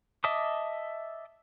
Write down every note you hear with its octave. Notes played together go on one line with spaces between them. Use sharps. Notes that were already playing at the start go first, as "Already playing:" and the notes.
D#5 E5 A5 D6 D#6